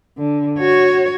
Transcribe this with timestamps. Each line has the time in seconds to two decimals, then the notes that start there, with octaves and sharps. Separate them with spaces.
0.18 D3
0.58 F#4 C#5